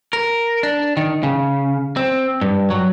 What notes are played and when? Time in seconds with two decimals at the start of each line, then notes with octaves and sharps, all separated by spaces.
0.13 A#4
0.63 D4
0.97 D#3
1.23 C#3
1.97 C4
2.41 G2
2.70 F#3